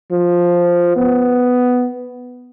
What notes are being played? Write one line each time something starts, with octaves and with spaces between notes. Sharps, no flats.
F3
B3